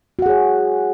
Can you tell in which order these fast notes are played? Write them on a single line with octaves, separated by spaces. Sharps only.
F#4 F#5 G#4 C#5